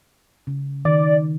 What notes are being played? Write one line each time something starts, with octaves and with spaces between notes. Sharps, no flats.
C#3
D#3 D5